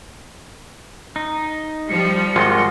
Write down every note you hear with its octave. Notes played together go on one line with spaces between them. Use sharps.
D#4
F3 G3 C#7
G#1 F4 D#5